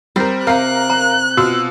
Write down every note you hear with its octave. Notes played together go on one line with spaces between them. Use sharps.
G3 C4 A#4
C3 C4 A#4 F5 F#6
A#5
B2 F4 F#4 E6